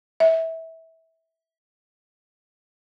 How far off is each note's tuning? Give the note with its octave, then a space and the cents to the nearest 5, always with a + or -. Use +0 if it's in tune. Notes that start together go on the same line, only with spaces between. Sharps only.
E5 -20